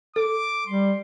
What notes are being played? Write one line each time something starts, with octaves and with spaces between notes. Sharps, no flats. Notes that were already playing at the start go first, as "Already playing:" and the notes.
A4 D6
G3 C6